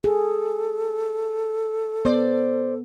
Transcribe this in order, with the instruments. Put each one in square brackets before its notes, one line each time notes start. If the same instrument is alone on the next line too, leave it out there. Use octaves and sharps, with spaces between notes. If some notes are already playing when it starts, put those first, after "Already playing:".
[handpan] G#4 [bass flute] A4
[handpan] B3 [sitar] C5 D5